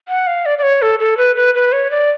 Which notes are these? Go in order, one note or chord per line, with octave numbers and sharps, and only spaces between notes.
F#5
F5
D5
D5
C#5
A4
A4
B4
B4
B4
C#5
D5